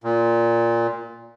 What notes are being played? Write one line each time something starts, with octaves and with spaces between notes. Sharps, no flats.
A#2